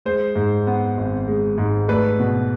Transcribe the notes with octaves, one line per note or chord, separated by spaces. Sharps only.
G#3 C5
G#2
B3
G#1
G#3
G#2
A3 B4 D5
B2